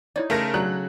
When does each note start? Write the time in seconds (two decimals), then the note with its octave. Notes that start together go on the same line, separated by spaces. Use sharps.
0.16 D#4 E4 C#5 D5
0.30 C#3 A3 A4 A#4 C5 A#6
0.54 F#3 A3 D5 A#5 F#6